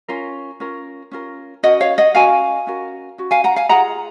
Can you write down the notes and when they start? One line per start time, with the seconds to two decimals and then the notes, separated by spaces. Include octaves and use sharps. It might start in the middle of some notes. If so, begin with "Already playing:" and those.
0.08 C#4 F4 A#4
0.60 C#4 F4 A#4
1.11 C#4 F4 A#4
1.63 C#4 F#4 A#4 D#5 F#5
1.81 C#5 F5
1.98 D#5 F#5
2.15 C#4 F#4 A#4 F5 G#5
2.67 C#4 F#4 A#4
3.18 C#4 F#4
3.31 F5 G#5
3.44 F#5 A#5
3.56 F5 G#5
3.69 F4 G#4 F#5 A#5